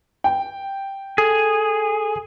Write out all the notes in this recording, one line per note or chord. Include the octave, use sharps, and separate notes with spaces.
G5
G#4 A4